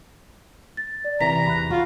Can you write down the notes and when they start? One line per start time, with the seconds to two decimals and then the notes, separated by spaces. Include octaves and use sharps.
0.77 A6
1.04 D5
1.21 C3 E3 A#5 B6
1.46 E2 B5 F#6
1.71 F4 F#4